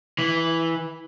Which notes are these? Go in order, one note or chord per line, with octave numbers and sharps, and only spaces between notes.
E3